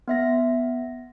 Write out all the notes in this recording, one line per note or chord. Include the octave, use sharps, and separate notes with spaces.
B3 E5 A#6